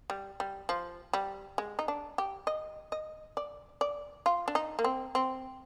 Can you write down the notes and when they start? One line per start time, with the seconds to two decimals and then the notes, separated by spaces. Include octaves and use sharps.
0.10 G3
0.40 G3
0.69 F3
1.13 G3
1.58 G#3
1.79 D#4
1.88 D4
2.18 G4
2.47 D#5
2.92 D#5
3.37 D5
3.81 D5
4.26 F4
4.48 D4
4.55 D#4
4.79 A#3
4.84 C4
5.15 C4